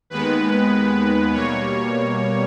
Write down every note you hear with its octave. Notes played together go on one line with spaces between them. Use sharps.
D#2 D#3 G#3 B3 B4
B2 G3 A#3 C#5